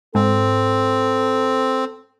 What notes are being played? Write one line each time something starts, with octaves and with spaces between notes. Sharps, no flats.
G#2 C4 A4